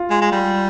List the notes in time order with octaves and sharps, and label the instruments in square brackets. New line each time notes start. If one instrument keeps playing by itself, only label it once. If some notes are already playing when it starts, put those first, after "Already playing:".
Already playing: [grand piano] F4
[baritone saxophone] G#3
G#3
G3